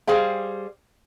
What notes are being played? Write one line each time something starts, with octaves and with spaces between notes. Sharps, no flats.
G3 G#4 C5 F5 G5